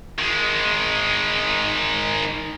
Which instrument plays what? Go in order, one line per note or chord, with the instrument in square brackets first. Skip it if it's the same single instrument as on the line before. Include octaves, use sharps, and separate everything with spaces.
[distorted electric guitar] D#3 G#3